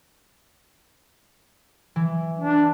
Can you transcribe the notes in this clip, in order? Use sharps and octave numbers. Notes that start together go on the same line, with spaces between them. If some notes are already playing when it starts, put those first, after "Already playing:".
E3
D4